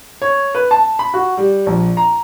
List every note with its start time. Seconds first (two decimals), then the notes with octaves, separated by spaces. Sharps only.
0.22 C#5
0.55 B4
0.71 A5
0.99 B5
1.14 F#4
1.37 G3
1.66 A#1
1.97 A#5